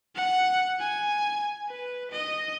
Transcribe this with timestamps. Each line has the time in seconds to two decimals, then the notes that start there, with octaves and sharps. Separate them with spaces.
0.15 F#5
0.79 G#5
1.69 B4
2.11 D#5